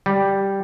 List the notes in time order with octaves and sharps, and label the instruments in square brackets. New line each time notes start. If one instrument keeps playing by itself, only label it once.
[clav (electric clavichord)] G3